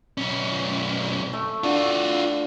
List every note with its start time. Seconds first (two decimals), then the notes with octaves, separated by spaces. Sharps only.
0.18 B1 C#4
1.33 A3
1.64 D3 F4 F#4